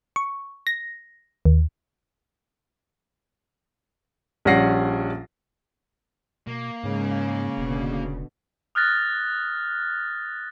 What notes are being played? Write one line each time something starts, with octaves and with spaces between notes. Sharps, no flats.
C#6
A#6
D#2
A#1 G3 C#4 F#5 A#6 C7
B2 A#3
G#2 C#3 G#3
E1 B2 D3
D#6 F6 F#6 A6 A#6